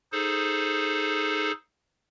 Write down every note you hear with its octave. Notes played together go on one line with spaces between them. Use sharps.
D#4 G#4 A4 C5